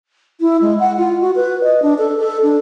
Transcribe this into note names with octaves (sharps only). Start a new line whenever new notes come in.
E4
G#3
F#5
F4
F#4
B4
D#5
D4
A4
A4
D4